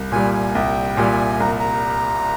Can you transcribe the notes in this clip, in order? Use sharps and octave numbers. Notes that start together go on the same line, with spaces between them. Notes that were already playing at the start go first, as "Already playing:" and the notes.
Already playing: C2
A#2 G3 G#5
G#5
C2 G5
A#2 G3 G#5
C2 A#5
A#5